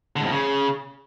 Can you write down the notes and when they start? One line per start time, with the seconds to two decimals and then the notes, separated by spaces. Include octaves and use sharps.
0.16 D3
0.21 G#2
0.26 F2
0.31 C#3